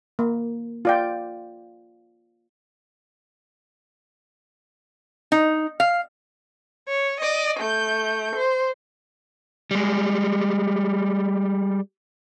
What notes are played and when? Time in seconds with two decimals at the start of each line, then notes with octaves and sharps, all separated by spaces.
0.19 A#3
0.85 F4 D5 G5
5.32 D#4
5.80 F5
6.88 C#5
7.20 D5 D#5
7.60 A3 G6
8.35 C5
9.71 G3 G#3